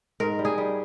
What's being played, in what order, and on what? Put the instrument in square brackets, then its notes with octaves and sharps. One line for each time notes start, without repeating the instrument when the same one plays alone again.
[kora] G#2 A#4
G3
G#4
G3